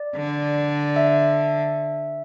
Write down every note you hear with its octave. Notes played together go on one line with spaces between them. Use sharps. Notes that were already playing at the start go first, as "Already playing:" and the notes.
Already playing: D5
D3
E5